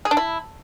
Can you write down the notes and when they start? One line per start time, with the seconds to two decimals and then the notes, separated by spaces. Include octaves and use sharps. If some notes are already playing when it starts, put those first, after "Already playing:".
0.05 G#4
0.11 D4
0.17 E4